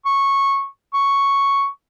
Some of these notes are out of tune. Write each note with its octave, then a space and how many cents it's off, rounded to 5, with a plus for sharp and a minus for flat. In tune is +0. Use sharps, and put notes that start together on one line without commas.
C#6 -10
C#6 +0